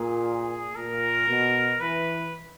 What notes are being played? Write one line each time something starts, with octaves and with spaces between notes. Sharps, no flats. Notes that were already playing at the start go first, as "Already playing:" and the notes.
Already playing: A#2 G#4
A#2 A#4
B2
E3 B4